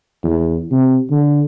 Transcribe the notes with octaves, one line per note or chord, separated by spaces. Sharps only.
E2
C3
D3